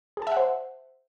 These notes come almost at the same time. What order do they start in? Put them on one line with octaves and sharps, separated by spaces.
G#4 A5 E5 F#5 C5